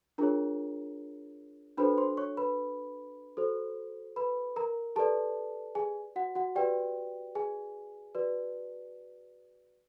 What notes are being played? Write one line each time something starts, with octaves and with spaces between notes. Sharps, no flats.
D4 F4 G#4 A#4 C#5 A#5
D4 F#4 A4 B4 C5 B5
C5 C6
C#5 C#6
B4 B5
F#4 A4 C5
B4 B5
A#4 A#5
G4 A4 B4 D5 A5
G#4 G#5
F#4 F#5
F#4 F#5
F#4 G4 B4 D5 G5
G#4 G#5
F#4 B4 D5